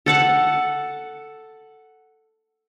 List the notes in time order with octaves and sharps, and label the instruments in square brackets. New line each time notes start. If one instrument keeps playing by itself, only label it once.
[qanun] A4 F#5 A5